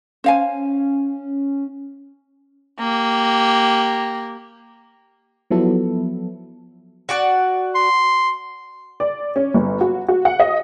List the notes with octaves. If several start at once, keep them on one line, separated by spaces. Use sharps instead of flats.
C#4 C5 F5 G#5
A#3 G4
F3 F#3 B3 E4 A4
F#4 D5 F#5
C6
D5
C#4
G1
F#4
F#4
F#5
D#5